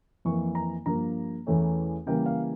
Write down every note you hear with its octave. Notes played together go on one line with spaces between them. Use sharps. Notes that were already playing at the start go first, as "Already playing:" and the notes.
F2 E3 A#3 C#6
A#5
G2 F3 A#3 A#5
E2 E3 A3 C#4
C#3 E3 G3 A#3 G5
F5